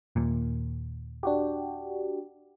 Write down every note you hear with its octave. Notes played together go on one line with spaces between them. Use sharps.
D#2 A#2
D4 F#4 G4